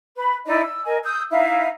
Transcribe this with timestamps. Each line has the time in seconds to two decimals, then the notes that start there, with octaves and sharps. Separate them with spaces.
0.16 B4 B5
0.46 D#4 E4 D5 D#5
0.61 E6
0.84 A#4 D#5 G#5
1.03 D#6 E6 G6
1.30 D#4 E4 E5 F5